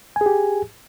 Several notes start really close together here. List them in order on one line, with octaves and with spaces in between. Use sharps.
G#5 G#4 G4